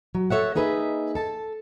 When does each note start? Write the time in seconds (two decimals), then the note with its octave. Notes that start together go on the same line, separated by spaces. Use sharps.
0.15 F#3
0.30 A4 C#5 E5 F#5
0.55 A#3 D#4 G#4 B4 D#5 E5
1.15 A4 A5